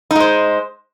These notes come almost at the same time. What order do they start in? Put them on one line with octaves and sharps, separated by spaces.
D#4 G#3 C5